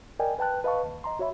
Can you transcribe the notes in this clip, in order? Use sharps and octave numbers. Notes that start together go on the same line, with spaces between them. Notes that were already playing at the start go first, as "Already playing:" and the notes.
A#4 D5 D#5 G5 G#5
B4 G5 A5 F#6
B4 D#5 F5 A5 C#6
D#2
D#5 A#5 C6
F#4 C#5 E5 B5